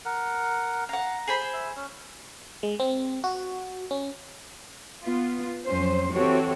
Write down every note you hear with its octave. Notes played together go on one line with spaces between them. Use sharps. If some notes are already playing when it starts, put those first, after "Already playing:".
A#4 F#5
F5 F#5 A#5
G#4 C5 B5
E5
C#4
G#3
C4
F#4
C#4
B3 F4
F2 F#3 C#4 C5
E3 C4 F#4 G4 A4 C#5